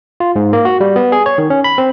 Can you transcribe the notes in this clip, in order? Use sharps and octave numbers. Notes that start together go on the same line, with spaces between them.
F4
G#2
A#3
F#4
G3
B3
G#4
C#5
D#3
C#4
B5
C4